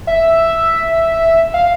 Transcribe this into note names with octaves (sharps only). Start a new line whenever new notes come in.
E5
F5